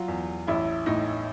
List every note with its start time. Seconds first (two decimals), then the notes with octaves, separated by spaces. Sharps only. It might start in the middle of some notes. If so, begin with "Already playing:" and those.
Already playing: F#3 F4
0.08 E2
0.47 A1 E4
0.86 A2 D#4